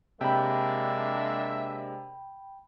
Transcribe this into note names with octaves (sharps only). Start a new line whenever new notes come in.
C3 G#3 A#3 D4 E5 G5 B5